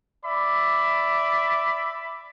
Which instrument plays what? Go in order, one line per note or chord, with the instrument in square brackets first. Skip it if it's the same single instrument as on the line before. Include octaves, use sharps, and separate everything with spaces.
[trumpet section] D5 E5 B5